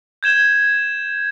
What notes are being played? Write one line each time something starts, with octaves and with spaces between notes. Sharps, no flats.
G6 G#6 E7 G7